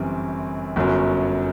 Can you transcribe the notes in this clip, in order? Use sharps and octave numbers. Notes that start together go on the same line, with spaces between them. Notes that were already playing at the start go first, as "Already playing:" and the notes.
Already playing: G1 F#2 E3 G3 C4
G1 F#2 F#3